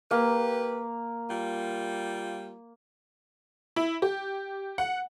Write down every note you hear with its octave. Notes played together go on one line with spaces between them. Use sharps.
A#3 G4 B4
G3 F4
E4
G4
F#5